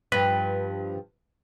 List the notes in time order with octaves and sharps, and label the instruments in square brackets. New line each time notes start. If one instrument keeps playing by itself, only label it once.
[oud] G2 F3 [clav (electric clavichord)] B4